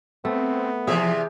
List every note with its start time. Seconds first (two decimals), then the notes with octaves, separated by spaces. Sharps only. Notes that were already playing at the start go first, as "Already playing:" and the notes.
0.25 A3 B3 C4
0.87 E2 C3 F3 G#4 E5